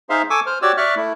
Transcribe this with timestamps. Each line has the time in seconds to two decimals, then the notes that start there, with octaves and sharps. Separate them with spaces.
0.10 D#4 G#4 C5 E5 F5 C6
0.30 A4 G#5 C#6 D6 E6
0.46 C5 F6
0.62 F#4 G4 C#5 D5 E6
0.77 D5 E5 C#6 F6 F#6
0.96 A3 E4